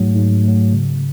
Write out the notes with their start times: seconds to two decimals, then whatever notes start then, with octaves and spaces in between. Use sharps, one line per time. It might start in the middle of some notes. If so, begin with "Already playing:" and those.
Already playing: G#2 F#3 A3
0.16 G#2
0.44 F#3 A3
0.73 C#3